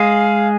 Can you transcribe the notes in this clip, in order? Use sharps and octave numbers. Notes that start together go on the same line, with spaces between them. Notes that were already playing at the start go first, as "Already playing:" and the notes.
Already playing: G#3 G#4 F5